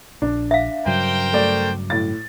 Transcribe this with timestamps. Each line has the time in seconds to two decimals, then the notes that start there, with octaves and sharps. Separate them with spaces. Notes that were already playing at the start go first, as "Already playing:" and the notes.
0.22 A#1 D4
0.51 E5 F5
0.86 G2 C#3 F#3 A#4 C5 G5
1.33 A3 D5
1.90 A2 A6